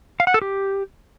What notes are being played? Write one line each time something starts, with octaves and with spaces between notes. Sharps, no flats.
F5
F#5
A4
G4